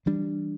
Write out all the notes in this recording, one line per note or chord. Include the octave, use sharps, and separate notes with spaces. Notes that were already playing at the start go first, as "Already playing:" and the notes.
E3 G3 D4